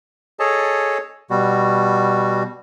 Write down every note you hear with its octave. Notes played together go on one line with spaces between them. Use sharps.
G#4 A4 C#5 D#5 A5
B2 G3 F#4